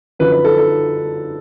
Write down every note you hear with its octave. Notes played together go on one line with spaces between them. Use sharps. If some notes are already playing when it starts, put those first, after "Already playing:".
F#2 D3 F3 B4
B4
A4
A4